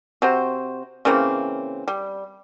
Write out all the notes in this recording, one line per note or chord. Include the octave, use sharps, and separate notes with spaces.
C3 F#4 C5
C#3 E3 A#3 C4
G3